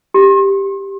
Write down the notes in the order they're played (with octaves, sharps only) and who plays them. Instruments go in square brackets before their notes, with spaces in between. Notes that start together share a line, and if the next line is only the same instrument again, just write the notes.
[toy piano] G4